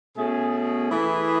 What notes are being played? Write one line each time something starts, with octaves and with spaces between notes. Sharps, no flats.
B2 A3 C#4 G#4
E3 A3 E4 G#4 B4